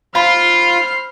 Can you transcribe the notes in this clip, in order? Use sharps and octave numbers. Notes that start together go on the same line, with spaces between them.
F4 C5 B5 F6 C7